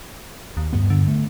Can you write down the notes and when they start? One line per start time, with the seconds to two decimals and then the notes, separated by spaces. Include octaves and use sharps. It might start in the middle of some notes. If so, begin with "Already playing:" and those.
0.57 D#2
0.73 G2 B3
0.90 D3
1.07 A3